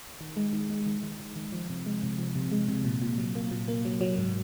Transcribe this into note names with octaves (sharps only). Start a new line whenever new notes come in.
D#3
G#3
D#3
G#3
D#3
D#3
D#3
D#3
F3
C3
G#3
C3
F3
C3
G#3
C3
A#2
A#2
F#3
A#3
A#2
A#3
F#3
F#3
G#2